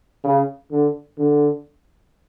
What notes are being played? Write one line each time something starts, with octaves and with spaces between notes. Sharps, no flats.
C#3
D3
D3